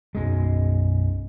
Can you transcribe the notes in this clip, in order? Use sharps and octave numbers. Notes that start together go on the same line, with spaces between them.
B1 F#2 G#3